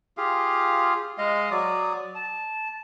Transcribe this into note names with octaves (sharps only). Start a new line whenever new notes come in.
F4 G4 G#4 F5
G#3 D#5 F5
F#3 D5 D#6
A5